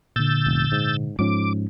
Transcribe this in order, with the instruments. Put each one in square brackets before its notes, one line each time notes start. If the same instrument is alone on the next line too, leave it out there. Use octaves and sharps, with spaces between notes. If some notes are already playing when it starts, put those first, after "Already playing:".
[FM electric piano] A#2 D3 [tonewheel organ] E6 G6 A6
[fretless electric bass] F1
G#2
[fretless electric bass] G#2 F3 C#4 [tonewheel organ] D6